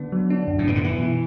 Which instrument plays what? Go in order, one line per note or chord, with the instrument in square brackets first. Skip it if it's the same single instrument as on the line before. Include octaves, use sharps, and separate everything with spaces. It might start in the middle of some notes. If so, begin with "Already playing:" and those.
Already playing: [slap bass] D3 [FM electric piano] B3
[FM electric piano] F#3
D4
F#2
[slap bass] A2
[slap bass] B2 [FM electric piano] B3
[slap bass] D3
[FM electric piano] B2 [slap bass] E3
[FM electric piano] E4